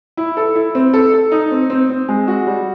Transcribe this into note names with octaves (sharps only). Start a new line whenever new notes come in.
E4
A4
E4
C4
A4
A4
D#4
C4
C4
C4
G#3
F#4
G3